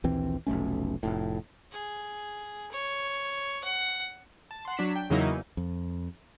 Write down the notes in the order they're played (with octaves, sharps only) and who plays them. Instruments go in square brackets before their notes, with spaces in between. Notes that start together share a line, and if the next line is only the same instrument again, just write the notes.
[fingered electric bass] A#1 D#2 E3 C4
F1 B1 A3 C#4
F1 A2
[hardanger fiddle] G#4
C#5
F#5
[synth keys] A5
F#5 C6
F#3 D4 B6 E7
G5
E2 C#3 F#3 A#3 D#4 E4
[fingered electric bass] F2